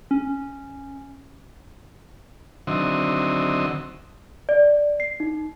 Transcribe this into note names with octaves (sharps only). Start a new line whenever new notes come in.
C#4
D3 D#3 F#3 C4 D#5 E5
D5
C7
D#4